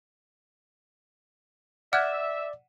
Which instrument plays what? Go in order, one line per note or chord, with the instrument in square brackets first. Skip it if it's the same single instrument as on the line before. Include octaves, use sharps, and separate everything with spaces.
[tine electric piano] D5 [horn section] E5 [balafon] F#5 [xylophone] F6 F#6 G#6